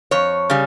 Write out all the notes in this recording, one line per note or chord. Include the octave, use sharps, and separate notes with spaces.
F2 C#5
C#3 G3